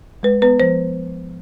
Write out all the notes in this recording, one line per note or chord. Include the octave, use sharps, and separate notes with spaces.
G#3 B4
B3 B4
F3 C5